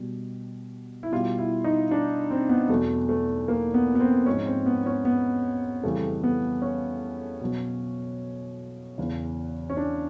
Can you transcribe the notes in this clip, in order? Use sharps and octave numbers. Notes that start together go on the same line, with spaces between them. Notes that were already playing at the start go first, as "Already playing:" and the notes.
Already playing: B2 G3
E4
B2 G3 F4
E4
D#4
D4
C4
B3
E2 B2 F#3 A3
A3
A#3
B3
B3
C4
G#2 F3 C#4
C4
B3
C#4
B3
F2 C#3 E3 G3 A3
B3
C#4
B2 F#3
E2 C#3 E3
C#4
D4